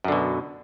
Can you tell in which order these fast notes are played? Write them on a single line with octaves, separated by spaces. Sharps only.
F#2 D3 B2